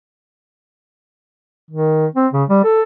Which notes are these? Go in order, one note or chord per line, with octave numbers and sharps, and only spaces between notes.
D#3
C4
C#3
G3
A4